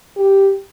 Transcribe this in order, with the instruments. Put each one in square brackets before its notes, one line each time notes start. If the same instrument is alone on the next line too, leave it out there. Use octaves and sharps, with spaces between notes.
[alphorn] G4